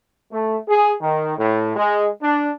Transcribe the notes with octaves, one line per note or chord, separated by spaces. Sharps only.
A3
G#4
D#3
A2
G#3
D4